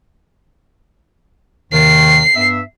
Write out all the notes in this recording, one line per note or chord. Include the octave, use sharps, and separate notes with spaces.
D#2 C3 D#3 C7
G2 B3 E5